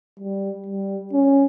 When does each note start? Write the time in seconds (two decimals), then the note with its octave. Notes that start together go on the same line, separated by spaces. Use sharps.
0.20 G3
0.67 G3
1.13 C#4